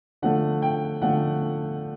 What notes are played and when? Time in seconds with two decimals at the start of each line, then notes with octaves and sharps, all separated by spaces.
0.22 D3 F3 A3 F#5
0.62 G5
1.02 D3 F3 A3 F#5